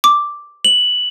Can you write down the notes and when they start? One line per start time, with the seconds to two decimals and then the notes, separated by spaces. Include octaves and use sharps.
0.04 D6
0.65 F#7